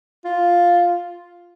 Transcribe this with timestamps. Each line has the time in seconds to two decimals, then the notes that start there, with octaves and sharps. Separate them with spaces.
0.25 F4